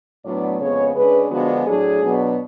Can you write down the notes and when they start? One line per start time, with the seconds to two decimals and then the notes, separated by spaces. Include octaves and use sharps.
0.25 A2 F#3 B3 D4 D5
0.60 F2 C#3 G#3 B3 C#5
0.95 C#3 G#3 D4 B4
1.31 D3 F3 G#3 B3 D4 F#4
1.66 A2 F#3 A3 D4 G#4
2.02 B2 F#3 B3 D4